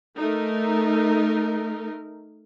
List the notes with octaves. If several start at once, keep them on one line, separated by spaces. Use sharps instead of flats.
A3 D#4 A#4